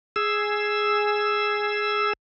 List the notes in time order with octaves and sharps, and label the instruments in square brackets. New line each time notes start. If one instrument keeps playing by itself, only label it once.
[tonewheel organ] G#4 E6